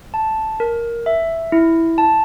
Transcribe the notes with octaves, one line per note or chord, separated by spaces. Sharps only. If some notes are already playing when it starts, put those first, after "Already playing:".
A5
A#4
E5
E4
A5